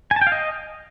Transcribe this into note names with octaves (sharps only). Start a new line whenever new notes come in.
G#5
A5
G5
F5
D#5